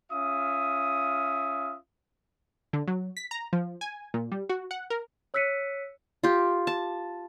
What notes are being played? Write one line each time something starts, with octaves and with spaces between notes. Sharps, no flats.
C#4 F4 E5 D#6
D3
F#3
B6
A#5
F3
G#5
A#2
G3
F#4
F#5
A#4
C#5 E6 F#6 B6 C#7 D#7
F4 G4
A5